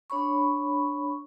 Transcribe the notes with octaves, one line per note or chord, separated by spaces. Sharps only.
D4 C#5 B5 C#6